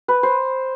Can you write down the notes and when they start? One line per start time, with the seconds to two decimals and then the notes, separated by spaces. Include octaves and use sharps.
0.08 B4
0.23 C5